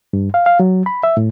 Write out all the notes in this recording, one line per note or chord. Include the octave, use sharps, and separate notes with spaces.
G2
F5
F5
F#3
B5
E5
A2